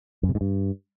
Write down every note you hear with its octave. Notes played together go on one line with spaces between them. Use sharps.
F#2
C3
G#2
G2